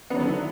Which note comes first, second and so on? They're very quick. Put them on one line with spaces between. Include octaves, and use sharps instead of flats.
B3 D#3 F#3 D3 E4